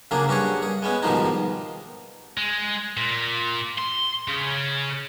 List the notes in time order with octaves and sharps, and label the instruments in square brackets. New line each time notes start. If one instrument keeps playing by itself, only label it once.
[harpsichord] C#3 F#3 A#3 D4 G#4
G2 C#4 F#4 G#4 C#5
G#4
G#3 B3 C#4
G#2 B2 D#3 F3 G3 D#4
[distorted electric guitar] G#3
A#2
C6
C#3